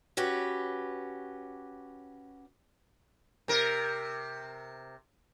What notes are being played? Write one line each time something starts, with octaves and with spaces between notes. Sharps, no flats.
C#4 F#4 G4 B4
C3 A#4